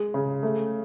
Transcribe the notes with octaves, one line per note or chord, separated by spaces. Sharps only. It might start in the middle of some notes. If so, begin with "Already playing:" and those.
Already playing: G#3
C#3
A3